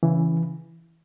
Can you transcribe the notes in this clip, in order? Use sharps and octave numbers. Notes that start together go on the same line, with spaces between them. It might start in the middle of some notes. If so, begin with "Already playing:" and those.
C#3 E3